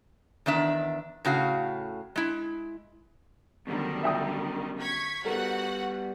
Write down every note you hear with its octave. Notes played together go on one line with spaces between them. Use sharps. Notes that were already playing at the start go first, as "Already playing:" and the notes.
E2 D#3 D4 E5
A2 C#3 F#4 F5
G#3 E4
F#2 B2 D3 D#3 G3
E5 G5 D#6
C#6 G#6 B6
G3 B3 F#4 A4 A#4 F#5